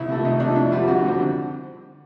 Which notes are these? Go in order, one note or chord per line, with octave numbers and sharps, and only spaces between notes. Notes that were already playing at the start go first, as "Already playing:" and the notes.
Already playing: C2 E4
C3 F3 A3
C2 D#4
C3 F3 A3 D4
F2 E4
D3 G3 C4 F4
F2 F#4
D3 G3 C4